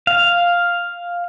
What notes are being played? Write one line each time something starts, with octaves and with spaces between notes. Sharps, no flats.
F5